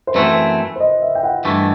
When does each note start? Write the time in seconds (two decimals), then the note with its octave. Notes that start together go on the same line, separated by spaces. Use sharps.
0.07 C5
0.15 F#2 E3 A3 C4 B4
0.76 C5
0.80 D#5
1.02 E5
1.15 G5
1.23 F#5
1.45 G2 E3 A3